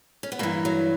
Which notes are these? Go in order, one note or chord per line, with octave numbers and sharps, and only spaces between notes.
C#4
B3
G2 E3 A#3
F#3